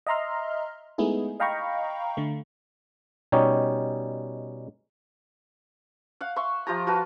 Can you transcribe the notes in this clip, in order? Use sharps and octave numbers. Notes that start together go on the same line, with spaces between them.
D#5 E5 A#5 C6 F6
G#3 A3 B3 D#4 E4 G#4
D#5 F5 G5 A#5 B5 C#6
D3 A3
B2 G3 C#4 D#4 G4 C#5
F5 F#5
E5 C6 C#6
F3 F4 G4 A#5
F4 F#4 B4 A5